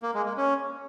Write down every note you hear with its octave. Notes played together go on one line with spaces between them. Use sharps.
A#3
G#3
A#3
C#4